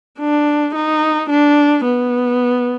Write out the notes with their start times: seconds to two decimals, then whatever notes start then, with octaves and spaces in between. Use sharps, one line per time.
0.19 D4
0.75 D#4
1.30 D4
1.85 B3